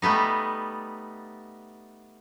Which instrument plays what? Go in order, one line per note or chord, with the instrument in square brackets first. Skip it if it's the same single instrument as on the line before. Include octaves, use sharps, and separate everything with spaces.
[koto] G3 A3 B3 D#4